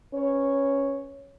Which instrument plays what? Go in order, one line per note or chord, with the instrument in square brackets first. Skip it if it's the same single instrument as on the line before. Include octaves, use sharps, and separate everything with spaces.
[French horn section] C#4 B4 C#5